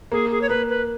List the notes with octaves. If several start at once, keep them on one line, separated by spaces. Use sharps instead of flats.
A#3 G#4
G#4
C#5
A#3 B4
B4